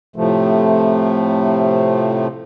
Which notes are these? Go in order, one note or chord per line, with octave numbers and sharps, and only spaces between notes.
A2 C3 F3 A3